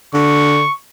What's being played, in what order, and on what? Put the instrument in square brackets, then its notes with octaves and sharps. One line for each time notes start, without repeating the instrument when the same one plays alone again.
[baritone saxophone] D3 [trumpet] C#6